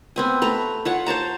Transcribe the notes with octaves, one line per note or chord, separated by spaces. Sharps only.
B3 C4 G#5
A3 B4 A#5
F4 C#5 F#5
C5 C#5 A5 A#5